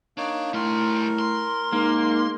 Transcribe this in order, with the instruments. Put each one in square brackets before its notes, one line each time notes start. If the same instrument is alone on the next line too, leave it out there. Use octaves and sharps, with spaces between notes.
[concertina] A#3 D#4 C#5 [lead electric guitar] D4
[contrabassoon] A2 [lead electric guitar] G3 C6 [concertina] A#4
[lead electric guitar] C6
[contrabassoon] G#2 [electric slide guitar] A#3